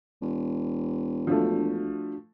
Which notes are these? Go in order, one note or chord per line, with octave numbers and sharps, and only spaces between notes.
E1
F3 A3 D4 F#4